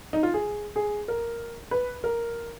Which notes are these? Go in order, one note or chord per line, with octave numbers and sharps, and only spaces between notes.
D#4
F4
G#4
G#4
A#4
B4
A#4